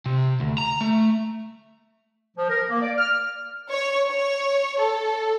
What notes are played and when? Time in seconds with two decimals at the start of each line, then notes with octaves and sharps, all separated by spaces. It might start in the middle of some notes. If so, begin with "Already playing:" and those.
0.06 C3
0.40 D2
0.58 A#5
0.81 A3
2.37 F3
2.49 A#4
2.69 A#3
2.80 D5
2.98 F6
3.70 C#5
4.07 C#5
4.79 A4